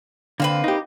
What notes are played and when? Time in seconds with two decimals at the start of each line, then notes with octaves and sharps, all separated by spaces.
0.40 D3 A#3 C4 B4
0.64 D#4 G4